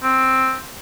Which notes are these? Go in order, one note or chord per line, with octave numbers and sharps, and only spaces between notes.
C4